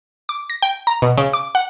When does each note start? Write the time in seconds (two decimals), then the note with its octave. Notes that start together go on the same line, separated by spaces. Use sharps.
0.29 D6
0.50 A#6
0.62 G5
0.87 A#5
1.02 B2
1.17 C#3
1.33 D6
1.55 F#5